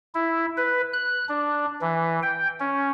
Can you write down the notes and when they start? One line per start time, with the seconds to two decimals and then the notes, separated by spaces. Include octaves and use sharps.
0.15 E4
0.57 B4
0.93 F#6
1.29 D4
1.81 E3
2.23 G5
2.60 C#4